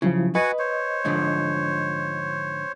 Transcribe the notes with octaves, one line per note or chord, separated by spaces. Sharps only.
C#3 F3 F#3 E4
F#4 B4 D#5 F#5 G#5
C5 C#5
G#2 D3 F3